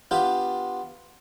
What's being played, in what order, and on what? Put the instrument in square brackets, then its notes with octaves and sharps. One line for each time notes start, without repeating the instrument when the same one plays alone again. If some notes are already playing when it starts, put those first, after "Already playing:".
[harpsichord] B3 D4 F4 G4